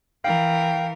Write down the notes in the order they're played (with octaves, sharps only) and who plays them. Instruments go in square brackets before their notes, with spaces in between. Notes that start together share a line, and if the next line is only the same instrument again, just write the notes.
[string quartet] E3 A#4 [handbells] F5 [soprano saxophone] G5